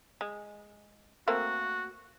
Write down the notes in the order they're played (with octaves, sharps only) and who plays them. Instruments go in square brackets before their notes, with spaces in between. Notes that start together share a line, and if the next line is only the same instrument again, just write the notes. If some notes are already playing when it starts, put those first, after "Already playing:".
[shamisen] G#3
[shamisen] A3 A#3 C4 [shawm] F#4